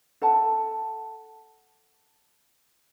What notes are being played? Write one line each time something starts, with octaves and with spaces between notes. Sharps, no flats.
A4 F#5 A5